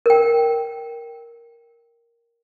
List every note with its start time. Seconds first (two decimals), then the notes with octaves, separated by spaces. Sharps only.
0.06 A#4 G5